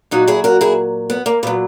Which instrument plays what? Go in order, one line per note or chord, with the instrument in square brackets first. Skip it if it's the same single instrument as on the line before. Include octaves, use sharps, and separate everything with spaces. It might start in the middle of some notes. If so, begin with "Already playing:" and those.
[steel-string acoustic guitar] A#2 F#3 D#4 F#4
E4 G#4
F#4 A#4
E4 G#4
B3
A#3
A#2 F#3 B3